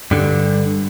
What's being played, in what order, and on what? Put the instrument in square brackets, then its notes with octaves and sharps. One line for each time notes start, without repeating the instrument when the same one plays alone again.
[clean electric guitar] G2 D3